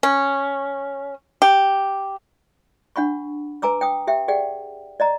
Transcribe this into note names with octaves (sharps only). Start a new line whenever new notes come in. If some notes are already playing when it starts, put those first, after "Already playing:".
C#4
G4
D4 F#5 B5 C#6
B4 G#5 A#5 D6 E6
G5 D#6
G4 E5 G5
G4 G#4 D5 F#5 G5
D5 D#5 A#5